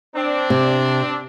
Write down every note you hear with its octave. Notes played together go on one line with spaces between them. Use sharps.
C4 D4
C3